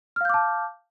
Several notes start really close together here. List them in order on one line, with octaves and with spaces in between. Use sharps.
F6 F5 G6 D6 A5